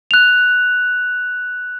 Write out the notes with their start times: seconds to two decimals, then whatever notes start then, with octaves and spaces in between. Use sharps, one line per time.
0.11 F#6 F7